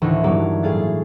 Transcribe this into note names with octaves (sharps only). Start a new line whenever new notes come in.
D2 A2 D#3 E3
G2 E3 F#3 A#3
A2 G#4 F5 A6